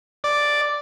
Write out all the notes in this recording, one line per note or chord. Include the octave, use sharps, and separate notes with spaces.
D5